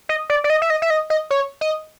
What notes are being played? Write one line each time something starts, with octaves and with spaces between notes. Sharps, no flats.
D#5
D5
D5
D#5
E5
D#5
E5
D#5
D#5
C#5
D#5